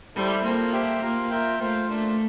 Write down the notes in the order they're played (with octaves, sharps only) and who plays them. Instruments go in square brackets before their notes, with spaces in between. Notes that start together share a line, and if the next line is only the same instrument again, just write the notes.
[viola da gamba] G3 [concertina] E4 A4 C5 E5
[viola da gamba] A#3 [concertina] C4 F4 A4 C5
[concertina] G4 C5 E5 G5
[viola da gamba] A#3 [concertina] F4 A#4 F5
[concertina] F4 A#4 E5 G5
[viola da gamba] A3 [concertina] F4 C5 F5
[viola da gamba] A3 [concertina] A#3 D4 F4